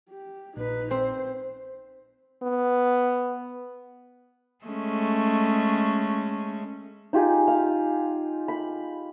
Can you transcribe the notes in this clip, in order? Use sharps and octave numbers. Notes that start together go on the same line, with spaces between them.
G4
A#1 D#4 B4
C4 C5
B3
G#3 A3 C#4
D#4 F4 G4 G#4
F5
B5